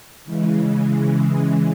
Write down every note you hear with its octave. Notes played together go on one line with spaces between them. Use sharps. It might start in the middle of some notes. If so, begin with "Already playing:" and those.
C#3 E3 G#3